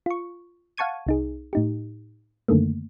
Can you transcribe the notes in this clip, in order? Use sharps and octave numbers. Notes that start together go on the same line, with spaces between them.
F4 C#6
F5 F#5 A5 C#6 G#6 D#7
C2 D#4 G#4
A2 D#4 G4
F#2 D3 D#3 A3 A#3